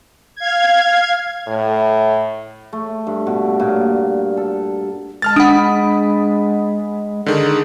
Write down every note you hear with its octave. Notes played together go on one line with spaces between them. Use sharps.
F5 G#6
A2
A3
G2
B2
A#2
A4
G#3 A5 F6 A6
D4 F#5 B5 D#6
D3 D#3 G#4